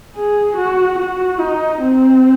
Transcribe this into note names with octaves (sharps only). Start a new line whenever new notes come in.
G#4
F#4
F#4
D#4
C4